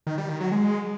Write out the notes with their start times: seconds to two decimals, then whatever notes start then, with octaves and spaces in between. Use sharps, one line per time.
0.07 D#3
0.18 G3
0.29 D#3
0.40 F#3
0.52 G#3